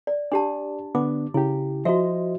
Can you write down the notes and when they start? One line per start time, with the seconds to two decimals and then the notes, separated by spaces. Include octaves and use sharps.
0.07 D5
0.32 D4 G4 D5 A5
0.95 D3 B3 D4 D6
1.34 C#3 E4 G4
1.85 F3 F#4 C5 D#5 E5